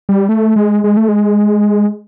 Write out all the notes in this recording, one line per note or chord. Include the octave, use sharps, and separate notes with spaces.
G3
A3
G#3
G#3
A3
G#3